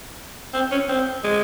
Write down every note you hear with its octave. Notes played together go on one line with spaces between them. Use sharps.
C4
C#4
C4
G#3